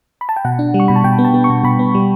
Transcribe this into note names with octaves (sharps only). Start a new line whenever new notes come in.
B5
A5
G5
B2 F#5
D4
G3
C#6
B2 B5
A5
B2 G5
B3
A5
B3
C#6
B2
B2 B5
B3
G3